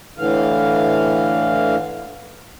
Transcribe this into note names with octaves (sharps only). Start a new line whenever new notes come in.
A2 D3 E3 F5